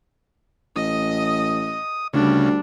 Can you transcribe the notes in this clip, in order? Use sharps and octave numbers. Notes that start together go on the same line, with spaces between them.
A1 D#5 D#6
D2 C#3 G3 D4